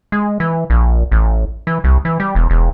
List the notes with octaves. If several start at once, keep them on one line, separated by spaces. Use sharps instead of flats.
G#3
E3
A#1
A1
E3
C2
E3
G3
E1
E1